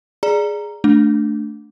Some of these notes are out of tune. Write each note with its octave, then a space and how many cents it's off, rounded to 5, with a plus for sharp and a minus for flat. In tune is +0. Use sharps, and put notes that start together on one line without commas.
G#4 +0 D5 +0 A#5 +0
A3 +0 D4 -5